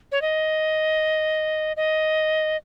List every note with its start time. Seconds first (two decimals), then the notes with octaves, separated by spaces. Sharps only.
0.12 C#5
0.22 D#5
1.77 D#5